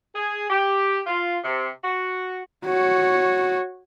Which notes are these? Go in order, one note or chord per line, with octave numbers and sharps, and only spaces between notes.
G#4
G4
F4
C3
F#4
F#4 C#5